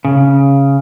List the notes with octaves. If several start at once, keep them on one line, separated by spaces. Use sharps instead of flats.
C#3